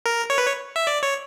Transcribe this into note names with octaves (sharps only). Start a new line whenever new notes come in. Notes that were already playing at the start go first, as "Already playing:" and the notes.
A#4
C#5
B4
C#5
E5
D5
C#5